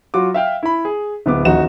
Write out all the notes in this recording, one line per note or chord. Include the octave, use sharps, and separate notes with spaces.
F#3 F4 F#4 D6
E5 F5 G5 F6
E4 B5
G#4
D1 B3 D6
D#1 A#1 D#4 F#4 E7